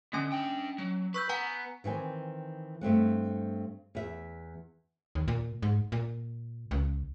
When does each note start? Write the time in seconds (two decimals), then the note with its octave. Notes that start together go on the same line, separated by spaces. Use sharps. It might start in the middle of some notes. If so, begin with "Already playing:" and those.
0.13 D3 A#3 C#4 G#5
0.32 D4 G5
0.78 F#3
1.14 B4 C#6 E6 G6
1.29 B3 F#5 G#5 A#5
1.84 D#3 E3 C4 G#5
2.81 G2 A3 C4 F#5
3.95 E2 E5
5.15 D#2
5.28 A#2
5.62 G#2
5.92 A#2
6.71 C#2